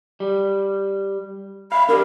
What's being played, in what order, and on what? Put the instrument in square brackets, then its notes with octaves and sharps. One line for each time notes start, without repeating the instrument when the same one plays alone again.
[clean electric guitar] G3
[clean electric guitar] E5 F5 [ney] B5
[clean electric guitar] D4 E4 G4 [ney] A#4